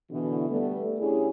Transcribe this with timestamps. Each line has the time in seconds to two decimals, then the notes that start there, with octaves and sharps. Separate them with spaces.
0.11 B2 D3 E3
0.50 G3 A3 B3
0.99 D3 C#4 E4 G4 G#4